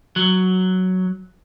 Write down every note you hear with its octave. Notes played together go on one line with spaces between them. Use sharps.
F#3